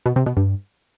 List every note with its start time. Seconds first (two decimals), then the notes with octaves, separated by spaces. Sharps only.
0.06 B2
0.16 C3
0.26 B2
0.37 G2